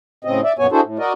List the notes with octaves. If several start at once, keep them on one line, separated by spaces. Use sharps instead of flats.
A2 C#3 C4 D#5
D5 E5
F#2 A#2 B3 C#5 G#5
D4 E4 F#4 G#4 A4 C5
A2
F#4 A#4 D5 D#5